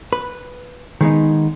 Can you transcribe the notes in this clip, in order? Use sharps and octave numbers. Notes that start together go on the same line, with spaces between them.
B4
D#3 G#3 B3 D#4